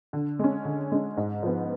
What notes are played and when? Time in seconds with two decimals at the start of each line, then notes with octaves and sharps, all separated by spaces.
0.13 D3
0.39 G#3 C#4
0.65 D3
0.92 G#3 C#4
1.17 G#2
1.43 F3 B3